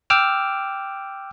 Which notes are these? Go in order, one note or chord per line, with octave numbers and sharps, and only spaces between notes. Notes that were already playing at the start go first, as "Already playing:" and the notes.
G5 D6 E6 F6